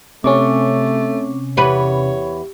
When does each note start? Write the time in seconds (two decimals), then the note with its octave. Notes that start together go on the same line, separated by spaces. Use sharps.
0.24 C3 A3 C4 C#4 C#6 D6
1.57 E2 G4 B4 C#5